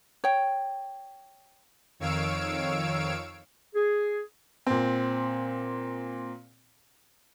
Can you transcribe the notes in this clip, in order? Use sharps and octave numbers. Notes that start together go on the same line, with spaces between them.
C#5 G5
F2 D#3 C#5 F5 E6 D7
G#4
A#2 C4